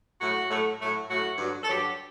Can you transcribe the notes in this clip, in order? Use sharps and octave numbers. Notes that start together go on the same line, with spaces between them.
A2 F#3 A3 F#4
A2 F#3 A3
A2 F#3 A3
A2 F#3 A3 F#4
G2 D3 F#3
A4
G2 D3 F#3 G4